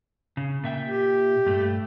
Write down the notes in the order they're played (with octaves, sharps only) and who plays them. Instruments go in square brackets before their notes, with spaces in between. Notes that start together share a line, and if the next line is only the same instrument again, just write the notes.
[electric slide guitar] C#3
A#2 E5 G5
[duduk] G4
[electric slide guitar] G2 A3